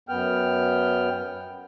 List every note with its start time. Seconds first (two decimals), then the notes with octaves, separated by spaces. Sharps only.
0.09 F#2 B3 G5 F6